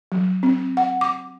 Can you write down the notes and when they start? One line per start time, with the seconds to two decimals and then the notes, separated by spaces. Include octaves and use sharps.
0.12 F#3
0.43 C4
0.77 F#5
1.01 D6